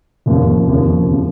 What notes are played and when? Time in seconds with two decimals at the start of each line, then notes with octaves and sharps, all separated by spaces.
0.26 F1 D#2 C#3 F3
0.67 F1 D#2 C#3 F3
1.11 C#3 F3